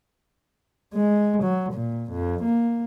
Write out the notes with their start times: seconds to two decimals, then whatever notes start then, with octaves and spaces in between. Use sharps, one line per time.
0.94 G#3
1.43 F#3
1.73 A#2
2.11 F2
2.44 A#3